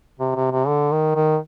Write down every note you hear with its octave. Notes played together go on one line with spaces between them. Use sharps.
C3
C3
C3
D3
D#3
D#3